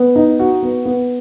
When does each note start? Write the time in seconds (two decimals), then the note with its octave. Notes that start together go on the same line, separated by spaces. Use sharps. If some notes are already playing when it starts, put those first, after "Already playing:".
Already playing: B3
0.16 D#4
0.39 F#4
0.63 B3
0.85 B3